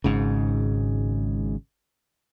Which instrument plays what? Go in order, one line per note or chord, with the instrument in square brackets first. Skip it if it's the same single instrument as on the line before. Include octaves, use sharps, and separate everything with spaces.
[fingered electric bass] G#1 G#2 C#3